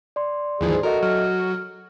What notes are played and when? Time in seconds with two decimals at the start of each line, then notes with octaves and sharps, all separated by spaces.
0.16 D5 C6
0.61 D#2 G#2 E3 F3 G#4
0.83 F#4 A4 A#4 D#5 E5
1.03 F#3 F6